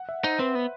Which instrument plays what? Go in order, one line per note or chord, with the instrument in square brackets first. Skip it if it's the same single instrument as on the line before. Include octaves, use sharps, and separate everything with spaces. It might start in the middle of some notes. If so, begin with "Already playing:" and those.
Already playing: [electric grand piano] F#5
E5
[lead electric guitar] D#4 [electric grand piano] C5
[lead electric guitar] C4 [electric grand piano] B4
[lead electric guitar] B3